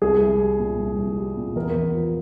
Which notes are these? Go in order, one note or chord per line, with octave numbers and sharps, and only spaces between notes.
C2 G#4
C2
G3
A#2
C2
C2
G3
A#2
E2 A#4
E2
F3